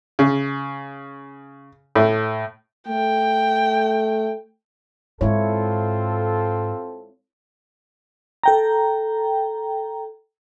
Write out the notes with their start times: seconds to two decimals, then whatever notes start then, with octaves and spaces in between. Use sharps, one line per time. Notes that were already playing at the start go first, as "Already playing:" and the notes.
0.19 C#3
1.95 A2
2.88 A3 G5
5.21 G#2 G#3 C4 E4 F4 A4 C#5
8.43 A4 G5 A#5